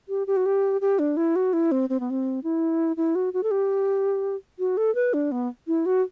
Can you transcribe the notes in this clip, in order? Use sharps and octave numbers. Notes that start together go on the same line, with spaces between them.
G4
G4
F#4
G4
G4
D4
E4
F#4
E4
C4
C4
B3
C4
E4
E4
F#4
F#4
A4
G4
F#4
A4
B4
D4
B3
E4
F#4